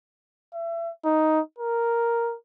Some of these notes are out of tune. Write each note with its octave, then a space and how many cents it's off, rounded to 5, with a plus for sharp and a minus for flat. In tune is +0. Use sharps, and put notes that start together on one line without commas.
E5 +30
D#4 +5
A#4 +0